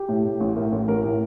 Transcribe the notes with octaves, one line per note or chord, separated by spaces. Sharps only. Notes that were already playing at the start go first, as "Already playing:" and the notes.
Already playing: G4
A2
A2
A1
A2 A#4
A1 A#4
A1 A#4
A2